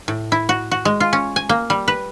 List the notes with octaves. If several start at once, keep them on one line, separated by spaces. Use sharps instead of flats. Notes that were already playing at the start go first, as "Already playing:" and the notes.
A2
E4
F#4
F#4
G#3
F4
C#4
G#5
A#3
G3
B4